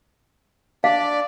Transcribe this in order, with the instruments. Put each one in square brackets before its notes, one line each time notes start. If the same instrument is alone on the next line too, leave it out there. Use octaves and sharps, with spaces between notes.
[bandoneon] D4 D5 [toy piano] F5